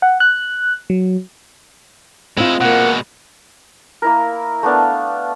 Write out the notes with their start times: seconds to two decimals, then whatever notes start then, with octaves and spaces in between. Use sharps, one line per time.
0.02 F#5
0.20 F#6
0.90 F#3
2.37 G#3 C4 E4 F4
2.61 B2 G#3 A#3 F#5
4.02 A#3 E4 A#4
4.63 A3 B3 D4 F5